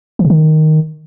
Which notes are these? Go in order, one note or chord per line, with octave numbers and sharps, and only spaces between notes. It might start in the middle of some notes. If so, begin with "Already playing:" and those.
E3
C3
D#3